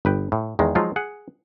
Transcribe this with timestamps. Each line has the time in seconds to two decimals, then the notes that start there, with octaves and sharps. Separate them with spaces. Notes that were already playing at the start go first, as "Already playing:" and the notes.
0.05 G1 B4 G5
0.32 A2
0.59 E2 D#3 G#3
0.75 F3 F#3 G#3 D#4 F4
0.96 G#4 F#5